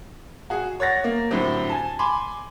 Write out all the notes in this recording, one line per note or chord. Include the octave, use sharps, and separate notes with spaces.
F#4 G#4
C#5 F#5 A6 A#6
A#3
A2 D3 F#3 C4 G4
G#5 A5
G#5 B5 C6 D6